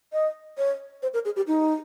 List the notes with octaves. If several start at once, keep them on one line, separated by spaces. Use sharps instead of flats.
D#5
C#5
C5
A#4
G#4
G4
D#4